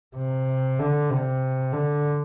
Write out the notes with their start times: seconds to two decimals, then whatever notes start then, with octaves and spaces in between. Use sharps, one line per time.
0.17 C3
0.79 D3
1.10 C3
1.73 D3